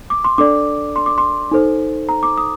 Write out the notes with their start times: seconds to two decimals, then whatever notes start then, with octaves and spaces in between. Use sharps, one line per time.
0.10 D6
0.24 C6
0.38 D4 A4 D5 D6
0.96 C6
1.06 D6
1.18 C6
1.51 D#4 A4 C5
2.09 A#5
2.23 D6
2.37 D#6